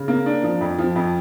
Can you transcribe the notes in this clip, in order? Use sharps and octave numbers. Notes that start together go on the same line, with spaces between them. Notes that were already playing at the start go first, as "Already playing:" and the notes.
Already playing: C#3
A#3
D4
F3
F2
F3
F2